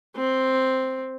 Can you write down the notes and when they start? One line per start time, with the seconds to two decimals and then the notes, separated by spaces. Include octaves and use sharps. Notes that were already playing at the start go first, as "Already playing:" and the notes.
0.16 C4